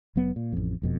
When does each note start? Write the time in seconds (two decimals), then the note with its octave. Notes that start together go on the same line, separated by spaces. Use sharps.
0.16 F1 F2 F#3 B3
0.36 A#2
0.53 A1 F2
0.82 E1 F2 B2